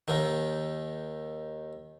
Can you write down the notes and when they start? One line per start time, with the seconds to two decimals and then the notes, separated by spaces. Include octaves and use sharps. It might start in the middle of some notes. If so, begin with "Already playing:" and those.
0.08 D#2 D#3